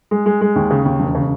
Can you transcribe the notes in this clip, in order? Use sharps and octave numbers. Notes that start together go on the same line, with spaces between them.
G#3
G#3
G#3
D#2
C#3
D#2
E1
C#3